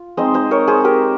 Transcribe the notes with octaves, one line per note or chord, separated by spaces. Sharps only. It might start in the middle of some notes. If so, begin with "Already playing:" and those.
Already playing: F4
G#3 C4 D#4 C5 D#5
C5 D#5
A#4 C#5
G#4 C5
G4 A#4